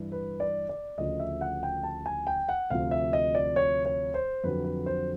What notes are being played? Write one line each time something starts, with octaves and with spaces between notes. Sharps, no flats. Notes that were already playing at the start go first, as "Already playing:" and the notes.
Already playing: G2 E3
B4
D5
D5
D2 C#3 F3 D#5
E5
F#5
G5
A5
G#5
G5
F#5
D2 C3 F3 F5
E5
D#5
D5
C#5
C#5
C5
F2 D3 F#3 B4
B4
C5